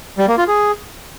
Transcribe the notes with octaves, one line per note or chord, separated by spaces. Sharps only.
G3
A#3
F4
G#4